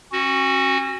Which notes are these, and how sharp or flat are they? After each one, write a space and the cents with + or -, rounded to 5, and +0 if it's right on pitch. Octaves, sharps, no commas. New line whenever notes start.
C#4 -35 F#4 +0